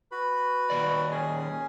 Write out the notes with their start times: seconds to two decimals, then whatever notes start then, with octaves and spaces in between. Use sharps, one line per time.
0.12 F#4 B4 B5
0.70 A#2 D#3 D5
1.11 C#4 G#4 G#5